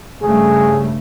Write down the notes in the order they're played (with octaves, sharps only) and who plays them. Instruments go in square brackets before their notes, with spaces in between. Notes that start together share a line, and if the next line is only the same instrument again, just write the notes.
[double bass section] G2 C#3 A3 [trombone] G#4